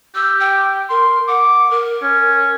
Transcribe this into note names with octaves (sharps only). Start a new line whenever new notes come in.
G4 E6
G5
A#4 C6
F#5 D6
A#4
C#4